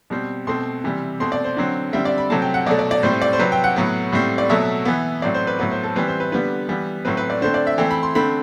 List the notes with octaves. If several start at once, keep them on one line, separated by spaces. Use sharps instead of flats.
B2 G3 C4
B2 A3 C4 C6
C3 E3 G3
B2 A3 C4 C6
D5
C5
D3 F#3 C4
D3 G3 C4 E5
D5
B5
C3 F#3 A3 C4 A5
G5
F#5
B2 F#3 A3 D5
D5
D5
A2 G3 C4 C5
D5
C5
C3 F#3 C4 B4
G5
F#5
A2 F#3 B3
A2 G3 C4
D5
B2 F#3 A3 E5
E3 B3
A2 F#3 C4 D5
C5
B4
A2 F#3 B3 B4
C5
A4
E3 G3 C4 B4
C5
B4
D3 G3 B3 B4
E3 G3 B3
A2 F#3 C4 B4
B4
D5
D3 A3 C4 C5
D5
E5
E3 A3 C4 G5
B5
C6
D3 A3 C4 B5